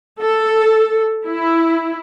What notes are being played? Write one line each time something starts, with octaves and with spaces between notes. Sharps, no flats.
A4
E4